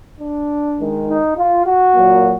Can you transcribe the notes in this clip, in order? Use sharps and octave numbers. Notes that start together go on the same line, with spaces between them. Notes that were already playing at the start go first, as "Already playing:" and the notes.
D4
D#3 G#3
D#4
F4
F#4
A#2 F#3 A#3